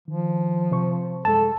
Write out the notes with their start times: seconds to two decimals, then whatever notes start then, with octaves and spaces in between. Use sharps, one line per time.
0.08 D#3 F3
0.71 C3 C5 C#6
1.25 F#2 G#3 A4 A5